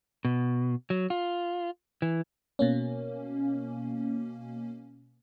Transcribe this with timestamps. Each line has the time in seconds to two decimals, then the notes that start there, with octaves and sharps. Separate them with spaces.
0.25 B2
0.90 F#3
1.10 F4
2.02 E3
2.59 B2 A#3 C#4